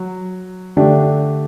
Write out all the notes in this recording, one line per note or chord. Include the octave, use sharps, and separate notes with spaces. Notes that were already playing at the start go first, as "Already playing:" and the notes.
Already playing: F#3
D3 A3 D4 G4